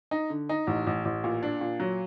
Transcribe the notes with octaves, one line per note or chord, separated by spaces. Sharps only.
D#4
D3
D#4
A1
A1
A1
A#2
D4
A#2
F#3